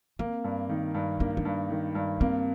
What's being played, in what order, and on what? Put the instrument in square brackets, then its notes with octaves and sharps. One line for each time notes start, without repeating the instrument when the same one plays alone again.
[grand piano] A#3 [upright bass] C4
[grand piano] G2
D#3
G2
[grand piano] A#3 [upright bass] D4
[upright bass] D4
[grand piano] G2
D#3
G2
[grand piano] A#3 [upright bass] C4